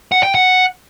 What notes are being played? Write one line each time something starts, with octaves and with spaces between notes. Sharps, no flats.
F#5
G5
F#5